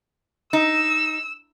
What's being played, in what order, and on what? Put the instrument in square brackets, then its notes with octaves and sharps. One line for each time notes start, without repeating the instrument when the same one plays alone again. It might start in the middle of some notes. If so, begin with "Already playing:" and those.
[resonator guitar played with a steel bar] D#4 [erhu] E6